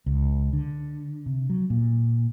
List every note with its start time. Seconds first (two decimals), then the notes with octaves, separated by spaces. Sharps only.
0.06 C#2
0.53 D3
1.26 C3
1.50 F#3
1.70 A#2